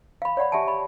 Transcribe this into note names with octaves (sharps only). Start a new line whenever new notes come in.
F5 B5
C#5 D5 F#5 B5
G4 E5 F#5 G#5 A5
B5